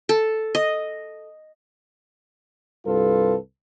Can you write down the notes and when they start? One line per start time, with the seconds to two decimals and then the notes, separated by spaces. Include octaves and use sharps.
0.09 A4
0.55 D#5
2.85 C2 G2 F4 A4 B4